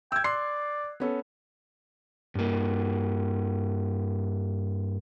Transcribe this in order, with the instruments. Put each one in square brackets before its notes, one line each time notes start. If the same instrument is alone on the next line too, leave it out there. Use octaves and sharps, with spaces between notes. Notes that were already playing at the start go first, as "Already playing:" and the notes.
[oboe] G5 [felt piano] E6 G#6
[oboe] D5 [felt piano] C6 F#6 C7
[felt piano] B3 C#4 A4
[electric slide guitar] G2 A#3